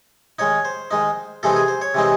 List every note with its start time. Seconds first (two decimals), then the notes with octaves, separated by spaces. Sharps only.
0.39 D#3 G#3 D#4 C#5
0.65 C5
0.91 D#3 G#3 D#4
1.43 C3 E3 G#3 C4 D#4 A4
1.56 G#4
1.68 C5
1.82 C#5
1.94 C3 E3 G#3 C4 D#4